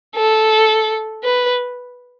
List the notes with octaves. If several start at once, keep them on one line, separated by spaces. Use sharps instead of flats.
A4
B4